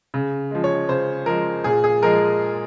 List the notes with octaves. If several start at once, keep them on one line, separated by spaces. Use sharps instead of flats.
C#3
F3 G#3
C#5
C#3 C5
F3 G#3 A#4
A#2 G#4
G#4
F3 G#3 A#4